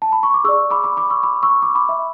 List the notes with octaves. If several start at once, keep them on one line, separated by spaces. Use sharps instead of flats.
A5
B5
C#6
D6
G#4 D5 C#6 E6
B5 D6
B5 D6
B5 D6
C#6 E6
B5 D6
C#6 E6
B5 D6
B5 D6
E5